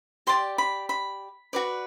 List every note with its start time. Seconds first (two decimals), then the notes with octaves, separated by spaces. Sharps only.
0.27 G4 D5 C6
0.58 B5
0.89 B5
1.53 F#4 B4 D5